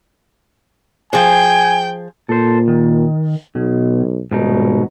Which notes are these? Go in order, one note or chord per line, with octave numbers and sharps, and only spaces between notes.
F3 G#4 C5 G5 G#5
A#2 A4 C5
D#3
B1 B2
D#1 G#2 B2 D#4